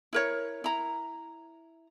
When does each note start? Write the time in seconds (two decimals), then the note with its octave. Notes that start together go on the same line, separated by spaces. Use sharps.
0.13 E4 A#4 C#5
0.64 E4 A#5